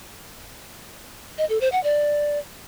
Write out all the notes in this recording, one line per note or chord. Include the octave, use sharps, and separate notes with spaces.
D#5
A4
C5
F#5
D5